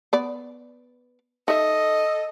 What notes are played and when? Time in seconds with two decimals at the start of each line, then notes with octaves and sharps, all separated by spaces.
0.13 B3 D5
1.48 D#4 A4 D#5 E5